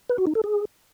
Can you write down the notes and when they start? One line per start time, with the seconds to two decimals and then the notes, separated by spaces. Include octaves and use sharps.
0.10 B4
0.18 F#4
0.27 D#4
0.35 A4
0.44 G#4